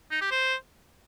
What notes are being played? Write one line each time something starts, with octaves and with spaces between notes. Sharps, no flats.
D#4
G4
C5